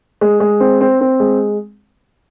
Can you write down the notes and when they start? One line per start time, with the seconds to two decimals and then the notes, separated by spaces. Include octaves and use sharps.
0.21 G#3
0.40 G#3
0.60 C4
0.81 C4
1.01 C4
1.20 G#3